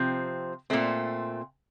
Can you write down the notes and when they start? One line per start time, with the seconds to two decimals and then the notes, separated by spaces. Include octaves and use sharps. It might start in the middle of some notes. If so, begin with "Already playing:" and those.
Already playing: C3 F3 C4
0.70 A#2 A3 C4